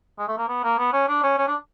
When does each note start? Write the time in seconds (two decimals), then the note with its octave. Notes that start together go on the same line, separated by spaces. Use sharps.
0.18 G#3
0.28 A3
0.38 A#3
0.48 B3
0.64 A#3
0.78 B3
0.93 C#4
1.08 D4
1.23 C#4
1.37 C#4
1.48 D4